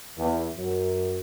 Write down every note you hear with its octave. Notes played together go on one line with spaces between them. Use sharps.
E2
F#2